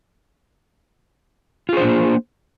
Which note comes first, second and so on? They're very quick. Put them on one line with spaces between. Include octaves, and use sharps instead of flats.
F4 G#4 C5 D4 A#3